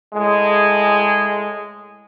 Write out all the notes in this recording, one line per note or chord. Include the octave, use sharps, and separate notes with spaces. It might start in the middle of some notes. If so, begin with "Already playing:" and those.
A2 G#3